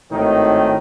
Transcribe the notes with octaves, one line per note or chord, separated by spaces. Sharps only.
G#1 A2 D#3 D#4